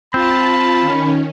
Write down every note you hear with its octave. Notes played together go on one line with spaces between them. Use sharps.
C4 F4 A5 B5
D#3 C#4